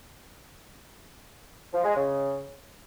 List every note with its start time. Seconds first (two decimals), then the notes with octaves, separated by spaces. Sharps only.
1.72 F3
1.84 G#3
1.96 C#3